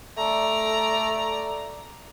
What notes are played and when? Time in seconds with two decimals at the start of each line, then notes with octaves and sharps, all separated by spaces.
0.17 A3 D5 A#5